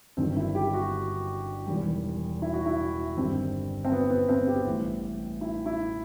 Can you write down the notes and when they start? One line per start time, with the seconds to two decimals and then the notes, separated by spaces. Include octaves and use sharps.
0.17 G1 G2 D#3 F#3 C4
0.36 E4
0.55 G4
0.74 F#4
1.66 E1 E2 D#3 G3
2.42 E4
2.53 F#4
2.66 E4
3.16 G1 G2 D#3 G3 C4
3.85 C4
3.92 B3
4.10 B3
4.29 C4
4.47 G4
4.66 A1 A2 G3
5.41 E4
5.66 E4